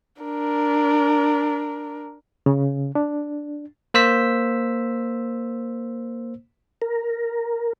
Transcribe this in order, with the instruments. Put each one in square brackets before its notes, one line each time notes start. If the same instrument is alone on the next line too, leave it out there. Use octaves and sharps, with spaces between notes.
[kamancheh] D4 A#4
[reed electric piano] C#3
D4
[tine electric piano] A#3 C5 E6 B6
[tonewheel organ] A#4